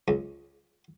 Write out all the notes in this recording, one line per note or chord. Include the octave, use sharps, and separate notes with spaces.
C#2